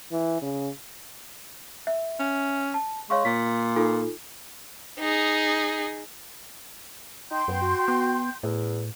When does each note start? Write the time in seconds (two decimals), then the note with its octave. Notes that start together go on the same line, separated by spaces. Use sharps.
0.12 E3
0.42 C#3
1.87 E5
2.19 C#4
2.74 A5
3.10 G#3 C#5 F5 C#6
3.25 A#2 B6
3.76 D#4 F4 A4
4.99 D#4 G#4
7.31 D#4 G5 C6 G6
7.48 F#2 B3
7.61 F#4
7.88 B3
8.43 E2 A2